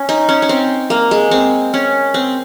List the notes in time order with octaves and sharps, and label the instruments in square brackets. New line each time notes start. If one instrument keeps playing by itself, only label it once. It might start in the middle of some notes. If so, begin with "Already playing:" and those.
Already playing: [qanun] C#4
D#4
C#4
C#4
C4
A#3
G#3
C4
C#4
C4